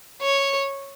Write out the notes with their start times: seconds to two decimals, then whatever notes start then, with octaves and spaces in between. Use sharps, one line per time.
0.22 C#5